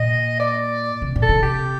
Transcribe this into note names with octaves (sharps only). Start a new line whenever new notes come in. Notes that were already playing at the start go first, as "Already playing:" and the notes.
Already playing: A#2 D#5
D5
C3
A#2
A4
C3
G4